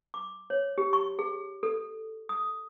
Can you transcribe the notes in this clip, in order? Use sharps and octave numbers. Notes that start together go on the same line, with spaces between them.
D6
C#5
G4
C#6
G#4
A4
D#6